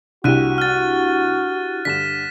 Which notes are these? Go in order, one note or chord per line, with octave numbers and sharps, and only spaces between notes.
C2 D4 E4 F#4 G4 F#6 D#7
F6 A6
G2 D3 B6 E7